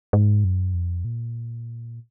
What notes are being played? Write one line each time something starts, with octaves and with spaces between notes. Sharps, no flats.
G#2
F#2
F2
A#2